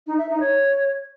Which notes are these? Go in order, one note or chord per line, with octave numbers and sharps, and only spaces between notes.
D#4
E5
D#4
C#5